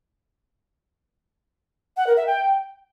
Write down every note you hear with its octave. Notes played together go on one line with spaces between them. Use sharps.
F#5
A#4
E5
G5